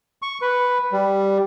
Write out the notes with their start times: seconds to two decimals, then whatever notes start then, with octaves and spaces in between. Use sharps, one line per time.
0.22 C#6
0.42 B4
0.92 G3